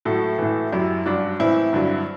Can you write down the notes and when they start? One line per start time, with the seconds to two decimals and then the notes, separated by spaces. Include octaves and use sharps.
0.05 A2 F#3 F#4 A4
0.38 A2 E3
0.72 F#2 F#3 E4 G4
1.06 G2 F#3 D4 F#4
1.40 A2 E3 C4 E4
1.73 G2 D3 F#3